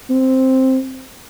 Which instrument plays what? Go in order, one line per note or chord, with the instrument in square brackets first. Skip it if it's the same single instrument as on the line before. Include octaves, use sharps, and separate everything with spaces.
[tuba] C4